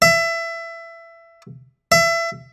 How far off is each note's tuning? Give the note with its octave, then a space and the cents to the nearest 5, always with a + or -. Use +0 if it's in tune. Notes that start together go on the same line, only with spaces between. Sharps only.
E5 +20
E5 +25